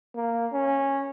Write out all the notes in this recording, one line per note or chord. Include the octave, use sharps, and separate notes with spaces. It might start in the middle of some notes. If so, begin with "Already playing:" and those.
A#3
C#4